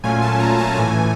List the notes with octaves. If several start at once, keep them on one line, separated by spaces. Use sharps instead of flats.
A#2 F#3 A3 C#4 F4 G#5
A5
A#5
A5
A2 E3 A3 G#5